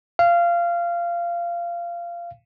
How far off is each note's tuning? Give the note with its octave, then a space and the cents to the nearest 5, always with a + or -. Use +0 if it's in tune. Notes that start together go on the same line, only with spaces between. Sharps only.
F5 -20